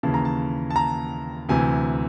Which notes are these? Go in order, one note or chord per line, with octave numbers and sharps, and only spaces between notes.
D#2 C#3 E3 A5
A#5
A5
A5
A#5
D2 C3 E3 G#5